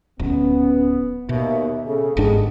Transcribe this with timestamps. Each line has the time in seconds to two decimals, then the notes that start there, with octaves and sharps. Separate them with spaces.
0.19 D1 B3 C#4
1.29 D#2 B2 A#3 E5
1.86 C#3 A4
2.17 G1 G#2 G#3 B3 D4 G4 G#4